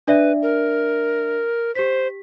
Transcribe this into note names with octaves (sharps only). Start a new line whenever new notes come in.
D4 B4 D5 E5
A#4
G4 C5 B6